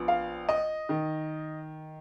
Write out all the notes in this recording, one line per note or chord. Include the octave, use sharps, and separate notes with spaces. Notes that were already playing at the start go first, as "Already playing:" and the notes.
Already playing: A#1 F3 B3
F5
D#5
D#3